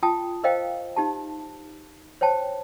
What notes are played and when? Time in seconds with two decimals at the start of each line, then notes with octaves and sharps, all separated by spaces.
0.03 F4 G5 A5 D#6
0.44 A#4 C5 D#5 F5 G5
0.96 D#4 G4 A5
2.21 C5 C#5 G5 A5